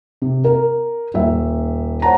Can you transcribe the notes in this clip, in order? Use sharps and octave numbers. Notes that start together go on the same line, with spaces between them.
C3
A#4
D#1 E5
C5 C#5 F#5 A5 A#5